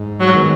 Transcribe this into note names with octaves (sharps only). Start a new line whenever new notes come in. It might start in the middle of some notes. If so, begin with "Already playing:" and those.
Already playing: G#2
F#3
D#3 G#3 B3